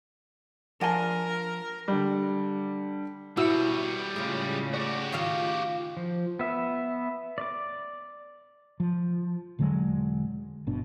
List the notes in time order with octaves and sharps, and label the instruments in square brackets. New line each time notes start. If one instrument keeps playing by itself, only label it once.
[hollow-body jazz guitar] F3 C6 [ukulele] D4 G#5 A5 [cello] A#4
[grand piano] D3 G3
[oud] B2 [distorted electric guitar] G3 C#5 [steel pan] E4 F#4 E6
[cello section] A2 C#3 [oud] G#3 F4
[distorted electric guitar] F#4 G4 [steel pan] D5
[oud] D#3 F4 F5
[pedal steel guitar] F3
B3 E5
D5 D6
[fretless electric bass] F3
E1 D3 F#3 G#3
G1 B2 D4